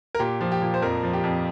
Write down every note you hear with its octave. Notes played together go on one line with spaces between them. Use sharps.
A#4
A#2 G4
F3
G4
A#2
C5
F2 A#4
F3
G4
F2